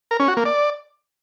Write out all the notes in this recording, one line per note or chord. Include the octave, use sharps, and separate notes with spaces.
A#4
C#4
F#4
A#3
D5